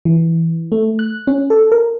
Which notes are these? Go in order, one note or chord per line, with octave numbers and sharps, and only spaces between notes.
E3
A3
F#6
C#4
A4
A#4